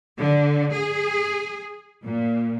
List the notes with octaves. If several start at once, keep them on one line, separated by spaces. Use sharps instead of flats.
D3
G#4
A#2